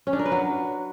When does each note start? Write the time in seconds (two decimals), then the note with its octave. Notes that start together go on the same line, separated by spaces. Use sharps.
0.07 C#4
0.13 D4
0.19 A#4
0.25 B4
0.32 F#3